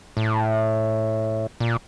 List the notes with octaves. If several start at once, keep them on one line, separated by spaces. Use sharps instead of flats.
A2
A#2